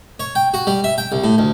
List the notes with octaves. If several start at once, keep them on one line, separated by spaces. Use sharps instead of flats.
C#5
G5
F#4
G3
E5
G5
C2
A2
D2